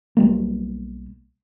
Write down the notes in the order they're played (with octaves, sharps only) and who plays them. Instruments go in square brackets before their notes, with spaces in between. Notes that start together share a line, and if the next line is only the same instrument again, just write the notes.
[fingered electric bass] B1 G3 A#3